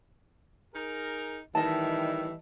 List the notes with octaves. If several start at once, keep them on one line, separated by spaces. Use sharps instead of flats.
D#4 G#4 A#4
A2 D#3 E3 G3 D#5 E5 A5